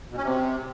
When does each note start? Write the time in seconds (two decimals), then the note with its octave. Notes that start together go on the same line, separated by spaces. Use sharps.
0.12 B2
0.17 C#4
0.23 C3